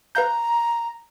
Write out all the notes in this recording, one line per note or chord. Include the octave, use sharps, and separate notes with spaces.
B4 F5 A#5 G6